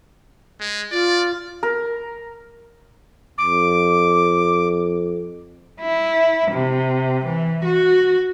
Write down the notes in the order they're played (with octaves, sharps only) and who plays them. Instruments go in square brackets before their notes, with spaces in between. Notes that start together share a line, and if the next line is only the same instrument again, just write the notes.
[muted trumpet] G#3
[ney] F4 [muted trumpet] D5
[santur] A#4
[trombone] F2 [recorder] D6
[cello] E4
C3
E3
F#4